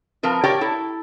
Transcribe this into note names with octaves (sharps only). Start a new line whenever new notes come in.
F3 C4 A#4 B4
G4 A#4 C#5 D5 G5
E4 A4